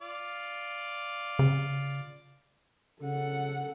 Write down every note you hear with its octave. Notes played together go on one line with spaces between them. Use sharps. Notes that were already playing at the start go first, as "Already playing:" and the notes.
F4 D5
C#3
C#3 A4 F#5